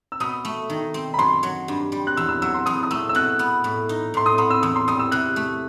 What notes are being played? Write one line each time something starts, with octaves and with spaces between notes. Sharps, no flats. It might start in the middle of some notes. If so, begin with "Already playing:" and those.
E6
B2 D#6
A3
D#3
C4
B5
F#2 C6
F#3
G2
G3
F#6
E2 E6
E6
F#3 E6
C6
E2 D#6
D#6
A3 E6
E6
B2 F#6
B3
A2
D#4
A2 C6
D#6
B3 C6
E6
E2 D#6
C6
G3 D#6
E6
C3 F#6
A3